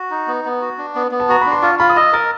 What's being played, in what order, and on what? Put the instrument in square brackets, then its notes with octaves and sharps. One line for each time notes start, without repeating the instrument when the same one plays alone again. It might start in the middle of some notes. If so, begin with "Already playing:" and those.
Already playing: [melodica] F#4
D#4
B3
B3
F#4
D4
B3
B3
[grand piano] A5
[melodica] F#4 [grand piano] A#5
[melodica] D4 [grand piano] B5
[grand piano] C6
[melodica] F4 [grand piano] C#6
[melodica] F4 [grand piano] B5
[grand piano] D#6
[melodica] D#5 [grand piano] E6
[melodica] A#4 [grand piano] A6